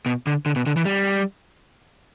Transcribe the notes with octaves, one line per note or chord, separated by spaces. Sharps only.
B2
D3
D3
B2
D3
E3
G3